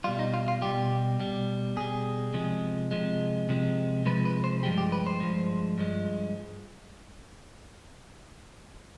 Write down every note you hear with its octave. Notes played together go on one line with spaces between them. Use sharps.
B2 G3 F4
D#4
F4
F4
B2 G3 G4
B2 G3
B2 G3 G#4
C3 F3 G#3
C3 F3 G#3
C3 F3 G#3
C3 F3 G#3 B4
B4
C5
G2 F3 G#3 G4
G4
B4
C5
G2 F3 G#3
G2 F3 G#3